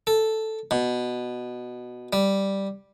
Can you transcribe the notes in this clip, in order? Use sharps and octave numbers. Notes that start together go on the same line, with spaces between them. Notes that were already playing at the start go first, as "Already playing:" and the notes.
A4
B2
G3